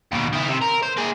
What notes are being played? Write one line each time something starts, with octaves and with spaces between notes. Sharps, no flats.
D#2 B2
D#3 E4
C3
A#4
C5
A#3 G#4